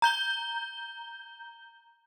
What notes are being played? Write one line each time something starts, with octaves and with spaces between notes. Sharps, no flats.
A#5 G6 G7